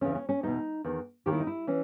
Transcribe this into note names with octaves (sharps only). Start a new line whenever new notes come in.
E2 C#3 E3 C#4
C#4
C#4
E2 B2 D#4
E2 D#3
D#2 D#3 G4
E4
D#4
E4
E3 C#4